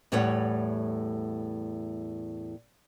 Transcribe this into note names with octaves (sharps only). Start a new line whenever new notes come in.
E2 A2 G3 A3 C#5 F#5